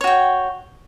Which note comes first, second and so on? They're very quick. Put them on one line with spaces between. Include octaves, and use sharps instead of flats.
C#5 F#4 G5